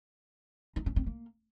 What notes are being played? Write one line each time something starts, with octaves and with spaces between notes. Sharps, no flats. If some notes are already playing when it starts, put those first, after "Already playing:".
D#4
C#4
C4
A#3